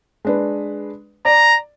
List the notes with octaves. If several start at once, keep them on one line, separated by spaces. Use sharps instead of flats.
G#3 D4 B4
D5 A#5